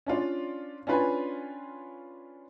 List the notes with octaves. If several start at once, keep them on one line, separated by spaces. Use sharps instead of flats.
C#4 D4 F4 D5
C#4 D4 F4 B4 G5 G#5